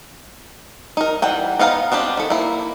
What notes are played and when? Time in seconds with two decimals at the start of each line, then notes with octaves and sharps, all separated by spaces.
0.97 D#4 A#4
1.22 E3 G3 F#5 G5
1.59 B3 D#4 F5 G5 A#5
1.92 B3 C4 D4 G4
2.17 D#3 A4
2.30 A#3 E4